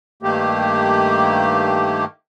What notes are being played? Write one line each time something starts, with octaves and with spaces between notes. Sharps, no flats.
G2 D#3 A3 A#3 G4